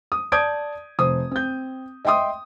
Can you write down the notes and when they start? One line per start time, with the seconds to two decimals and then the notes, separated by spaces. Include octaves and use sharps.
0.12 D#6
0.32 D5 A5 D#6 G6 G#6 D7
0.99 F1 C5 D#6
1.31 C4 G6
2.05 D#5 E5 G5 C6 D#6